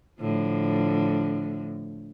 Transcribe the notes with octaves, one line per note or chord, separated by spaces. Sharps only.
A2 D3 F3